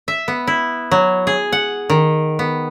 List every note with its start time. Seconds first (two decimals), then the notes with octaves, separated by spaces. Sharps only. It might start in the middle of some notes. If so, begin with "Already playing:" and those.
0.08 E5
0.28 B3
0.47 E4
0.91 F#3
1.27 G#4
1.52 F#5
1.90 D#3
2.39 B3